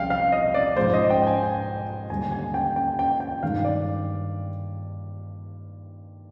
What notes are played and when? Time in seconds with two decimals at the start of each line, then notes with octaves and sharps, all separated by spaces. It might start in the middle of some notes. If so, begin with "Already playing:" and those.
Already playing: C2 C3 F3 G#3 F5 G5
0.10 F5
0.32 D#5
0.54 D5
0.76 G#2 F3 G#3 C5
0.94 D#5
1.10 G5
1.27 G#5
1.43 G5
2.10 D#2 D3 G3 G#5
2.32 G#5
2.54 G5
2.76 G5
2.99 G5
3.20 G5
3.43 G2 D#3 G#3 F5
3.65 D5